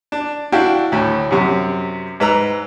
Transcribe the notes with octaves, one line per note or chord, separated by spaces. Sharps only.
D4
D4 E4 F#4 F5 G5
D2 A2
F#2 C3
G#2 B4 A#5 E6